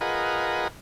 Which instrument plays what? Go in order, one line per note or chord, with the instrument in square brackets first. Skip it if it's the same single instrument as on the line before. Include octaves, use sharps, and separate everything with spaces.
[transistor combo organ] F4 G#4 A#4 B4 D#5 F#5